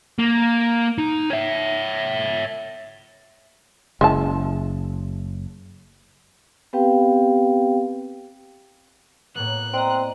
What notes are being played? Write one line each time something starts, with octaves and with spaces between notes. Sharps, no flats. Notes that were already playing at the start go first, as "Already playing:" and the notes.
A#3
D#4
C#5 E5
F#1 C#3 G#3 E4 A5
B3 C4 G4 B4 F5 G5
A2 A#3 B3 F#6
C4 D5 D#5 A#5